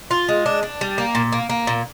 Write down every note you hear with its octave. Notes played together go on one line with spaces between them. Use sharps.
F4
G#3
D4
D4
G3
A#3
A#2
A#3
A#3
A#2